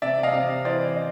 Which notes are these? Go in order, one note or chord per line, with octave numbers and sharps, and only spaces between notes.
C3 D5 E5
D#5 F5
C3
E3 C5 D5
D#5